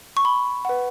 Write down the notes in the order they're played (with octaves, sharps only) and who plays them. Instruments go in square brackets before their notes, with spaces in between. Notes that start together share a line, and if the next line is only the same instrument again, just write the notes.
[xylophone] C#6
B5
B4 F#5